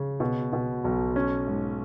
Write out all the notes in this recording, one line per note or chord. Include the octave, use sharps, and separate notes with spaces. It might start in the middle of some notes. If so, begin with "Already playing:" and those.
Already playing: C#3
B2
B2
B1
C#4
G#2